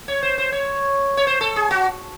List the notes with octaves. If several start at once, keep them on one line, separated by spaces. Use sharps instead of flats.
C#5
C5
C5
C#5
C#5
C5
A4
G#4
F#4